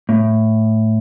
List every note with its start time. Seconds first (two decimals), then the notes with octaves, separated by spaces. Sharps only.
0.09 A2